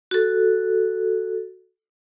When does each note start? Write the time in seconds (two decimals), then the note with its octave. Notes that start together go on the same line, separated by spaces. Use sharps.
0.11 F#4 A4